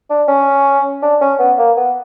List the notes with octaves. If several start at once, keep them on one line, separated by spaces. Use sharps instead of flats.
D4
C#4
D4
C#4
B3
A#3
B3